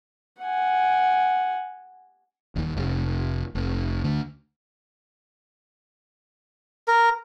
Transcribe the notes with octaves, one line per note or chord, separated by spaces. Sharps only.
F#5 G#5
D#1 D#2
F1
F1
D2 D3
A#4